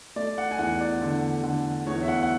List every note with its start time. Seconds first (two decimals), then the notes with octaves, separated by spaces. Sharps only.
0.16 A3 D5
0.38 F#5
0.51 G#5
0.59 E2 F#5
0.81 D5
1.02 D3
1.43 D3
1.87 E2 C#5
2.03 E5
2.08 F#5
2.23 F#5